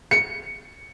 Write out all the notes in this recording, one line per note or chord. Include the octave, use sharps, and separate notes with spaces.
C#7